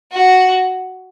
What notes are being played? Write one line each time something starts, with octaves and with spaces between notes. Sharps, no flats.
F#4